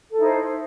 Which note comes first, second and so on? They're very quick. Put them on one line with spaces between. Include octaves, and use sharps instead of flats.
A4 E4 D#4 C5